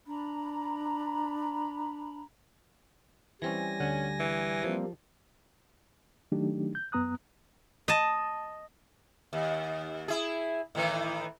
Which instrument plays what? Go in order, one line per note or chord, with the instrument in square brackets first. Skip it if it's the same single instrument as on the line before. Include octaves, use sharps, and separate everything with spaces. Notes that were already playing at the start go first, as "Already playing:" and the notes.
[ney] D4 [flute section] A#5 B5
[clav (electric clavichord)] E3 C4 C#4 [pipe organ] G3 G#5 A#6
[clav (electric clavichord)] D2 D3 F#5 [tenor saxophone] C#4
[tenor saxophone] E3
[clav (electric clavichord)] F3 [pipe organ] G3 A#3 C4
[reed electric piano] D#3 F#3 A3 D4 D#4 G4
G6
F#2 B3 A#5 D#6 F#6
[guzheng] D#5 A5
[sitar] D#2
E4 G#4
A2 D#3 E3